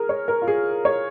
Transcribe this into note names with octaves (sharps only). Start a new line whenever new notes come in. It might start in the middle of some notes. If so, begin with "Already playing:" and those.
Already playing: G#4 A#4
C#5
A#4
F4
G#4
C#5